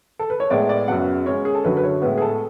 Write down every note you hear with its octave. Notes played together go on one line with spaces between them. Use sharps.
A4
B4
C#5
A2 G#3 B3 D5
D5
F#2 C#3 F#3 B3 F#5
C#3 G#3 C#4 C#5
G#4
A4
F#2 D3 F#3 B4
B4
C#5
A2 G#3 B3 B4
G#4
A4